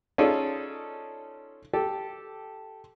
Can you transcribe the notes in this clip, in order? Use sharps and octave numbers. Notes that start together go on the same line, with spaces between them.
C#4 D#4 F4 G#4 A4 D5
G4 A4